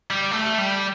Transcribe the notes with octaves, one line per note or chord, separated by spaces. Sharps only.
G3
A3
G3